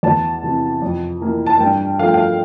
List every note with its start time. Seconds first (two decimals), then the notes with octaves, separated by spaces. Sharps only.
0.03 E2 A5
0.43 C3 E3
0.82 F2
1.21 E3 A#3
1.46 A5
1.60 G2 G5
1.99 F3 A3 F5
2.07 G5
2.14 F5